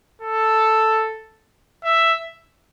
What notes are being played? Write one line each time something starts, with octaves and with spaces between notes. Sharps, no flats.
A4
E5